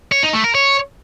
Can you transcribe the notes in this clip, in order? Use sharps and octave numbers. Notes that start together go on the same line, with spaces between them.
C#5
D#4
A3
A#4
C#5